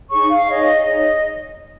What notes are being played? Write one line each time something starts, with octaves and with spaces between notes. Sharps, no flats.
D#4 G#4 C#5 C#6
F5
D#4 G#4 C#5 D#5
D#4 G#4 C#5 D#5